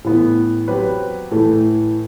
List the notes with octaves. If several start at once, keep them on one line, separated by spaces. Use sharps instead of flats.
A2 E3 B3
F#3 C4 G4 B4
A2 E3 A3